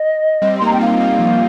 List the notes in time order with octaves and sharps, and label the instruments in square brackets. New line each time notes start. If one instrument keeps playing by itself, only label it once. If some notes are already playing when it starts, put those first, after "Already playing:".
Already playing: [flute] D#5
[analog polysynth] G3 C4
[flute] C6
[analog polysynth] A#3 D#4 [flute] A#5
[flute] G5
[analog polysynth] C4 F4 [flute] F5
[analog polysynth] A#3 D#4
F3